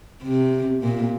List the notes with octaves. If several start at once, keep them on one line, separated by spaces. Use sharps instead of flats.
C3
A#2